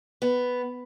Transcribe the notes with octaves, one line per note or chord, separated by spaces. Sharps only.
B3